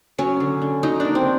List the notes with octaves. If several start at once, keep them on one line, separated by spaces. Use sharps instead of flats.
F#3 C#4
D3
D3
F#3 D#4
A#3 D4
C4